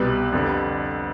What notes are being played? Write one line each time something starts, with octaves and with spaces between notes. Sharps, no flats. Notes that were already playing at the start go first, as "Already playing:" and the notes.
Already playing: C2 B2 G3 B4 D5
F2 D3 G3